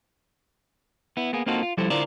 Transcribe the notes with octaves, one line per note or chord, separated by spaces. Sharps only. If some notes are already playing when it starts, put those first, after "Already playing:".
B3 E4
A#3 B3 G#4
A#3 C4 D#4 F4 F#4 A4
F4
F3 G3 E4 A4 C5
D3 E4 F4 A#4 C5 D5